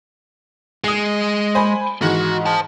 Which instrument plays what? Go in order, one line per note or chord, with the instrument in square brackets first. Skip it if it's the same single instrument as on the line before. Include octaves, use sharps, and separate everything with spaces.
[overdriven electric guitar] G#3 [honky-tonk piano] D#6 C7
[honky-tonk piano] C5 G#5 B5
[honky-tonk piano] G#2 D#3 E3 [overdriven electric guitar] F#4
[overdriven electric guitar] C5 A5